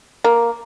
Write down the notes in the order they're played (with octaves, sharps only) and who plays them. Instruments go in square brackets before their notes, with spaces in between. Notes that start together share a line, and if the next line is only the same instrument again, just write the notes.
[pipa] A#3